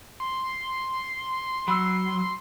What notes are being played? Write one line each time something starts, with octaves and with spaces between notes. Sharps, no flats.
C6
F#3 B5 E6